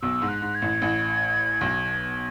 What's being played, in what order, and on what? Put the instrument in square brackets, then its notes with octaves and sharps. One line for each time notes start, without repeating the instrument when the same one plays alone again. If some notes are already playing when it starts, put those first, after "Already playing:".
[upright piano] B1 B2 [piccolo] E6
[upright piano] G#2
[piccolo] F#6
[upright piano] G#2
[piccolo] G#6
[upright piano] A1 A2
A1 A2
B1 B2